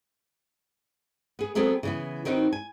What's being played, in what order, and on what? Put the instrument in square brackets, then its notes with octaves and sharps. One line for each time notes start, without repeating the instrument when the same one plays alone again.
[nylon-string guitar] B3 G#4
F#3 B3 C4 G#4 A4 B4
C#3 E3 B3
D#3 C4 D#4 F#4 B4
G#5